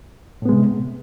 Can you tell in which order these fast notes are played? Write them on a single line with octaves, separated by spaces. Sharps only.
A2 B3 G#3 C3